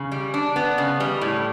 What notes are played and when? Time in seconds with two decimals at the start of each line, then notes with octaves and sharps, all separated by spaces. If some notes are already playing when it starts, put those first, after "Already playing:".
Already playing: C#3
0.12 G3
0.34 D4
0.56 B3
0.78 C#3
1.00 G3
1.21 A2